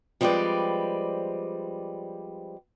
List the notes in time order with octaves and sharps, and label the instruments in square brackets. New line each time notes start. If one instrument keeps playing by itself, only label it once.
[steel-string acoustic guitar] F3 G3 G#3 C4 B4 D5